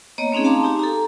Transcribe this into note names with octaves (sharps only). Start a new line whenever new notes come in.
A#3 B3 C#5 D#5 A#5
A3 C4 C#4 D#4 G#4
F5 A5 A#5 C6 D6
D#4 G4 G#5
A4 A#5